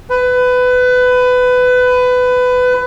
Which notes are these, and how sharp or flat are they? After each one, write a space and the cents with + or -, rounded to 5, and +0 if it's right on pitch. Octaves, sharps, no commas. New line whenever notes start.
B4 +20